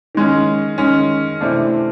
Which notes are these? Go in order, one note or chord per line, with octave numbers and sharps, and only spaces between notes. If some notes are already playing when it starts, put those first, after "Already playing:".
D#3 G#3 C#4
D#3 G#3 C#4
C3 E3 A3 D4